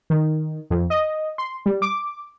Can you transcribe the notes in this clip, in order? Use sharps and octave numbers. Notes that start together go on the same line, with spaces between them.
D#3
F2
D#5
C6
G3
D6